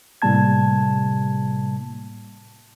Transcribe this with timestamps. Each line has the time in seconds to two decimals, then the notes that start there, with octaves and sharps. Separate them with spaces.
0.22 A2 C3 G3 A#3 A5 G#6